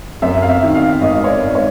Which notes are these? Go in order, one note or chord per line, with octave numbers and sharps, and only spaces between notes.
F#2 E5
F5
E5
D#3
F5
G#1 D#5
C#5
D5
G#1
C#5